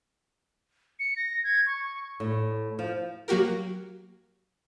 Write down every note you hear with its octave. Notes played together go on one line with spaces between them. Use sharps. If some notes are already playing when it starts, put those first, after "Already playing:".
C#7
A#6
G#6
C#6
A2
F3
F#3 A#3 F#4 G4 A#4